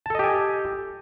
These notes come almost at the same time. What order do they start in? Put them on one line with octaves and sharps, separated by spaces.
A5 A4 D#5 G4 G#5